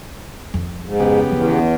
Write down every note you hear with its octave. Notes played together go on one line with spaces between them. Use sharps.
F2
G#2
C#3 B3 G4
E2 F3 C#4